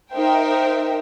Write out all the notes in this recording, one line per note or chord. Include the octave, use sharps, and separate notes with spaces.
D#4 A#4 C5 E5 G5